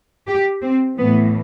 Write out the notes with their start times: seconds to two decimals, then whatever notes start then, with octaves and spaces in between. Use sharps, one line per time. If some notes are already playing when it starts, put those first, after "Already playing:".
0.28 G4
0.62 C4
0.98 A2 E3 B3